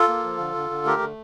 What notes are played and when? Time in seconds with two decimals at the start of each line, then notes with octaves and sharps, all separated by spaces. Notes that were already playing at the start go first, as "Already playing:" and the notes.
Already playing: F4 A4
0.08 A#3
0.24 F3
0.38 D3
0.55 D3
0.70 D3
0.85 A3 G4 A#4
1.01 D3